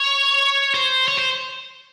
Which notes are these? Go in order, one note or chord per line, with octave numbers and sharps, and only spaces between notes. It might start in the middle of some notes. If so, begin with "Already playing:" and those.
Already playing: C#5
C5
C#5
C5